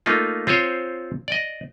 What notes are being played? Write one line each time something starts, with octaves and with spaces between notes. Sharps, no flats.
A3 A#3 D#4 F4
C4 F4 G#4 C5 C#5
D5 D#5